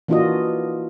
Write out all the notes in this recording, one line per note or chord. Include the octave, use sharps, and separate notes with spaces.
E3 A#3 D4 F4 F#4 D#5